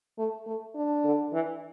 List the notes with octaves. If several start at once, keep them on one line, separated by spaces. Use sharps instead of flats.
A3
A3
D4
D3
E3